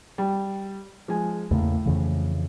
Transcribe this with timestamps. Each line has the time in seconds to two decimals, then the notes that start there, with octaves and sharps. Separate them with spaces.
0.18 G3
1.08 F3 G#3 G#5
1.51 E2 A2 C#3 A#3
1.86 F2 C#3 E3